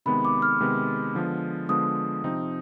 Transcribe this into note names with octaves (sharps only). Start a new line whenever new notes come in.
C3 D#3 G#3 B3 B5
D6
F6
C3 D#3 G#3 B3
D3 F3 G#3 B3
D3 F3 G#3 B3 D#6
C3 F3 C4 D#4